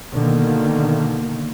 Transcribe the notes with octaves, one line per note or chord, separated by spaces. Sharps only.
B2 D3 D#3 A#3